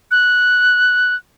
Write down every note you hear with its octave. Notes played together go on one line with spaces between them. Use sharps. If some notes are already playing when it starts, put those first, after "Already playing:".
F#6